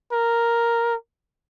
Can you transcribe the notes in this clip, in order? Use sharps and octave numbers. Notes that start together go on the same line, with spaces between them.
A#4